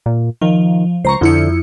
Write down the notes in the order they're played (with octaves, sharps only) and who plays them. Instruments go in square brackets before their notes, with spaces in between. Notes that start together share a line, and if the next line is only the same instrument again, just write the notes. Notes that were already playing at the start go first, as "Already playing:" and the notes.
[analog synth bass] A#2
[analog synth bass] D#3 [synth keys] F3
[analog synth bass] C#2 [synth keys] C5 A#5 C#6
[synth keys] F2 E4 C#7 [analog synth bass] D3